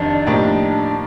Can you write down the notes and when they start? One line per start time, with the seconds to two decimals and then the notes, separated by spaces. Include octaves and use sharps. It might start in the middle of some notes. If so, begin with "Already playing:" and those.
Already playing: F2 C3 D#3 D4
0.27 A2 F3 A#3 D#4 G4